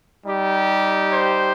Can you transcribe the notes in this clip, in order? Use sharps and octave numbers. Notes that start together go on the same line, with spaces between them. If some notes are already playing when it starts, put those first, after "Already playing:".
G3 D#4 G4
C5